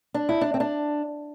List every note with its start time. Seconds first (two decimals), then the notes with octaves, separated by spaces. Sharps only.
0.14 D4
0.29 E4
0.41 D4
0.54 C4
0.60 D4